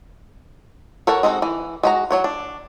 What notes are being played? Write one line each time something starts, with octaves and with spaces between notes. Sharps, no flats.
A4 A#4 C#5 F#5
G#3 C4 D#4 F#4
E3
G#3 F#4 A#5
F#3 C#5 F#5
D4